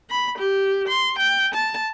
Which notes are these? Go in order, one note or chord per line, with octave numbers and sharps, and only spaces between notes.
B5
G4
C6
G5
A5